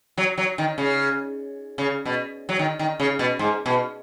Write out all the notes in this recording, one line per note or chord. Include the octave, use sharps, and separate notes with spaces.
F#3
F#3
D#3
C#3
C#3
B2
F#3
D#3
D#3
C#3
B2
G#2
B2